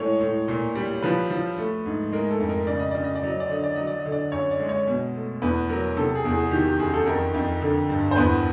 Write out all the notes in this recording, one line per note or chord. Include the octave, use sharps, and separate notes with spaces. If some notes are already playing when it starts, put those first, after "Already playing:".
Already playing: A2 G#3 C#5
A2
A#2
G3
F3 B4
F3
A3
G#2
G#3 A#4
A4
F2
A#4
C#3 D5
D#5
C#3 D5
D#5
D5
F#3 D#5
D5
D3 D#5
D5
F#3 D#5
D5
D#5
D3
D5
F#2 C#5
D5
G#3
C#5
B2
A3
E2 B4
F#3 A#4
C3 A4
G#4
E2
G#4
D#3 G4
G4
F#2 G#4
A4
F2 A#4
F2
D3
G2
C5
E2 B4